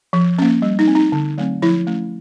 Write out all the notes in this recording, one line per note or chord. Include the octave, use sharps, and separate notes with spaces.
F3
A#3 C#4
G3
D#4
C4
D#4
D3
F#3 A3 C4
F3 E4
A3 C#4